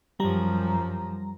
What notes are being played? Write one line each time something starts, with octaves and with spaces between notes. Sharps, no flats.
F#2 F3 G3 A#5